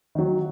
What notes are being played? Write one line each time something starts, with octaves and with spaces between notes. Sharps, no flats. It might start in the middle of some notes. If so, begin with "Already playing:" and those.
D#3 F#3